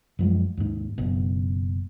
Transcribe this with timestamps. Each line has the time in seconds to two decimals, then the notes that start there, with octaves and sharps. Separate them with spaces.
0.19 F#2 F3 G#3
0.57 D#2 G#2
0.98 F#1 B2